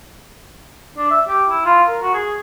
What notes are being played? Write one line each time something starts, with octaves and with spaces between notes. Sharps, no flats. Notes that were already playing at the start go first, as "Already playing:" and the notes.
D4
E5
G4
E4
F4
A#4
F#4
G#4